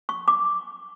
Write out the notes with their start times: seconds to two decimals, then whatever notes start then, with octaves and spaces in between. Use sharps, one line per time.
0.09 C#6
0.28 D6